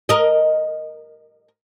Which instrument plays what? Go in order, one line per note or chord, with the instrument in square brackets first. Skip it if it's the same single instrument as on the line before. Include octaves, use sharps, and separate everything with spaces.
[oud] A#4 D#5